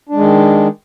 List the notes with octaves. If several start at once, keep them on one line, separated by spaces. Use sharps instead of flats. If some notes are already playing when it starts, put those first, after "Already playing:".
D#3 G#3 D4